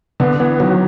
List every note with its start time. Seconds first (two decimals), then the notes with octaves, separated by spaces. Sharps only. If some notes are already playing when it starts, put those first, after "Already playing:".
0.20 D3 B3
0.40 E3 B3
0.60 D#3 F#3